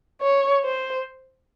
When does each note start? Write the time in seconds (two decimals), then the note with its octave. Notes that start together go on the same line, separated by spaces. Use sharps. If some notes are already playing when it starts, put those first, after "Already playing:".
0.22 C#5
0.64 C5